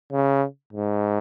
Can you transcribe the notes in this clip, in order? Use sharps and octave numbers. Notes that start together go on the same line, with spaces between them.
C#3
G#2